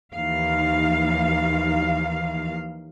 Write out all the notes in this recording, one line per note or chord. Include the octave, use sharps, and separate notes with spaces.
D#2 E3 F3 D#4 F5